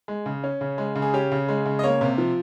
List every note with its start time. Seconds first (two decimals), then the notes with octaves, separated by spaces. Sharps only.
0.08 G#3
0.26 C#3
0.44 C#4
0.61 C#3
0.78 G#3
0.95 C#3
1.02 G#4
1.14 C#4 G4
1.32 C#3
1.49 G#3
1.65 C#3
1.79 D#5
1.83 A#3 C#5
2.01 C3
2.18 F3